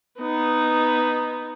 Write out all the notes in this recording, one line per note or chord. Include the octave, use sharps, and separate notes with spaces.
B3 D#4